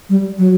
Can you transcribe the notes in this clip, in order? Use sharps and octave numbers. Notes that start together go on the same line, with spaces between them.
G3
F#3